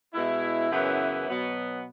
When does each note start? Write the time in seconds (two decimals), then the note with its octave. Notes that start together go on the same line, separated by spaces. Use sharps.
0.14 B2 G#3 E4
0.70 F#2 C#3 E3 B3 E4
1.28 B2 F#3 B3